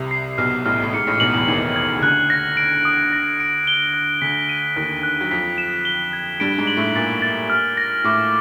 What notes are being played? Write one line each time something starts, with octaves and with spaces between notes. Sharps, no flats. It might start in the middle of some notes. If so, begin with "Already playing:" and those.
Already playing: C2 C3
C7
B1 B2 F6
A1 A2 F6
A2
G#2 C#7
A1 A2
B1 B2 F#7
E2 E3
D#2 D#3 G#6
G#6
C#3
D2 D3 F#6
A#6
D7
D#6
A#6
D7
G7
F#6
D2 D3 B6
D#7
D#2 D#3 F#6
F#6
F#3
F2 F3 B6
E7
G7
G#6
G2 G3 D7
G#2 G#3
F#7
A2 A3
A#2 A#3 A6
A6
F6
A#6
A2 A3 D6